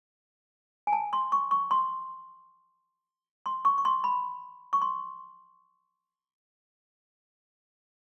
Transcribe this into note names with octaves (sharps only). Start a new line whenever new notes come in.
G#5
A5
C6
C#6
C#6
C6
C6
C#6
C#6
C6
B5
C#6
C6